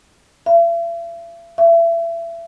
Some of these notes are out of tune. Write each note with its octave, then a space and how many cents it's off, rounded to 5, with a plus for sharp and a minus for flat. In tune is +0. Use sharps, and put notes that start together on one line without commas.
E5 +45
E5 +30